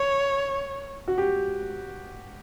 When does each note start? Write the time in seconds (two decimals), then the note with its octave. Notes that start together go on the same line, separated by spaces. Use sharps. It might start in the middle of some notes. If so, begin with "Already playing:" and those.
Already playing: C#5
1.08 F#4
1.18 G4